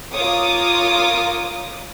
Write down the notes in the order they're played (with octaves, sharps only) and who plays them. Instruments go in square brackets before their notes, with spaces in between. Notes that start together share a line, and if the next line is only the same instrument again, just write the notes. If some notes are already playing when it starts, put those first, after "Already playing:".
[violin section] F4 A#4 C#5 D6 D#6